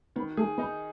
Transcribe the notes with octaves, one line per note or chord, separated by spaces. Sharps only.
D#3 B3
A3 G#4
B3 D#4